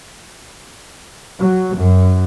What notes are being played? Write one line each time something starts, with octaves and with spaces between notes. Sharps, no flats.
F#3
F#2